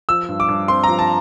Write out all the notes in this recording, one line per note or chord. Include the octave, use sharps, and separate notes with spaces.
F3 E6
G2
D6
G2
C4 C6
F3 A#5
A5